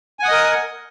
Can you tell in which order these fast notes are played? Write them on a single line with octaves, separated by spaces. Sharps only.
G#5 F#5 D#6 D#5 A#4